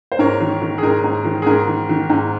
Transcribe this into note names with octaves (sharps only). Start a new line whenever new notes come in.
C5
G#2 A#4 C#5
D#3
D#3
G#4
G#2 A#4
G#2
D#3
G#4
G#2 A#4
D#3
D#3
G#2